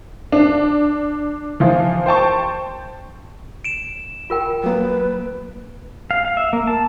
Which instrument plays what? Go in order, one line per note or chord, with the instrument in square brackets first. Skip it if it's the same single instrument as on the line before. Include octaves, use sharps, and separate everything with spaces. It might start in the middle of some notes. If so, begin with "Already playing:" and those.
[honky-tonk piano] D4
E3 F3 F4
C5 G5 A5 C#6
[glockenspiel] D7 E7
[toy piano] F4 A#4 G5
[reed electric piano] F#3 A#3 [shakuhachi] B4
[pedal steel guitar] F5
F5
E5
A#3
A5